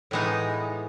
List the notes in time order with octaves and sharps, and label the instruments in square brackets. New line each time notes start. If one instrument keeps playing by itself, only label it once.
[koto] A2 E3 G#3 B3 D#4